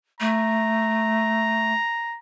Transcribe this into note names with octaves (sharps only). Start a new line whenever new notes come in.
A3 A#5